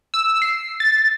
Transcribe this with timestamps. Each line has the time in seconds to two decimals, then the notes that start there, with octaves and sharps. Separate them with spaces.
0.14 E6
0.42 C7
0.80 A6